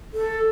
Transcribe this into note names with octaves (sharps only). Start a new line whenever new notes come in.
A4